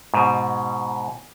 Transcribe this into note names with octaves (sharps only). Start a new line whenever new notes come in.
G#2 B2